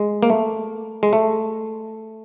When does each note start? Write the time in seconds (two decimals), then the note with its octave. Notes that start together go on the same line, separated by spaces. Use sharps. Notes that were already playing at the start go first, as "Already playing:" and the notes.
Already playing: G#3
0.23 A#3
0.30 A3
1.03 G#3
1.13 A3